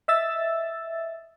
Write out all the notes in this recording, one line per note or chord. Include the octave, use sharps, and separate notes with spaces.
D#5 E5 E6 A6